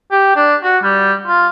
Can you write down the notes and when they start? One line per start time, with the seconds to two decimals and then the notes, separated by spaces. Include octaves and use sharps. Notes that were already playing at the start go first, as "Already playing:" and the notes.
0.11 G4
0.36 D4
0.64 F#4
0.83 G3
1.27 F4